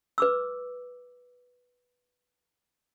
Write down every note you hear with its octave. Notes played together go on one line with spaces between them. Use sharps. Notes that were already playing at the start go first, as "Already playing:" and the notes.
B4 D6 E6